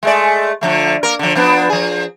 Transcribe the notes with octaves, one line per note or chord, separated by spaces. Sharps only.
G#3 A3 D5
D3 F3 A3
A#3 A#4
D3 F3
F3 B3 D4
F3 G#4